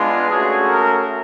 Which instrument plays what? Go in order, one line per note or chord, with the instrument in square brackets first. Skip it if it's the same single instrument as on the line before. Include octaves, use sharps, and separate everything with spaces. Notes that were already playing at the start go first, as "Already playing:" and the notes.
Already playing: [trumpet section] G#3 B3 D4 F4
A3 C#4 F#4 G#4
A#4